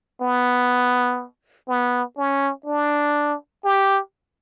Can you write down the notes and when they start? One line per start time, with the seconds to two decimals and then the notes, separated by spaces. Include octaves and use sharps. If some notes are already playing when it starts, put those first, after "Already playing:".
0.22 B3
1.69 B3
2.18 C#4
2.66 D4
3.65 G4